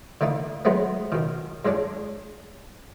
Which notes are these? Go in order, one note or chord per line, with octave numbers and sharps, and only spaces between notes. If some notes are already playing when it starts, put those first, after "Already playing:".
D3 A3 A#3 D#4
F#3 G#3 A3 B3 C4
B2 D#3
G2 G#3 C#4 D4